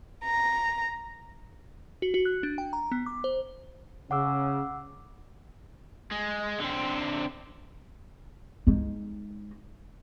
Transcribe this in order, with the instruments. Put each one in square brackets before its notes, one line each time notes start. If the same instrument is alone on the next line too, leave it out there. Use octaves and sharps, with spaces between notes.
[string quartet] A#5
[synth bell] F#4
F#4
F#6
D4
G5
A#5
B3
D6
C5
[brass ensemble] C#3 [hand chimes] F#5 D6 E6
[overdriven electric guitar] G#3
D3 C4
[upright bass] G#3 D#4